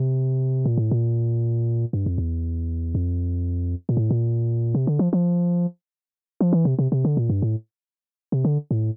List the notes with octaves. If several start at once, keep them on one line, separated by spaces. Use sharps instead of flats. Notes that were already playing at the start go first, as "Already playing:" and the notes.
Already playing: C3
A#2
A2
A#2
G2
F2
E2
F2
A#2
A2
A#2
C3
D3
F3
F3
F3
E3
C3
C3
C3
D3
A#2
G2
A2
C3
D3
A2